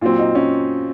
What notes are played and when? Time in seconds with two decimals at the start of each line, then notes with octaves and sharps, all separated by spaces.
0.01 A#2 F#3 C4 F4
0.19 D#4
0.35 C#4